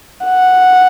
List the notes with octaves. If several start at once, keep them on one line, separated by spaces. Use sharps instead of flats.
F#5